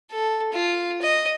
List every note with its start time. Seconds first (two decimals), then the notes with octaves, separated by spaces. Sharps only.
0.11 A4
0.53 F4
1.02 D#5